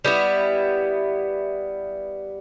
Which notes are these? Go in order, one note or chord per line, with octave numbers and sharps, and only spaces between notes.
G3 B3 E4